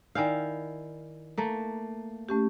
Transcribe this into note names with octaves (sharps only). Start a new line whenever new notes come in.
D#3 E4 D5 F5 G#5 G6
A3 A#3 A#5
A3 C#4 G4